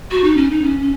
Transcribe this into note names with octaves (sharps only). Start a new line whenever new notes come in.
F#4
D#4
C#4
D#4
C#4
C#4